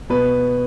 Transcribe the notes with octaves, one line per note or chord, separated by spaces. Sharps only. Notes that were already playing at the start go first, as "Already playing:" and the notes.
B2 B4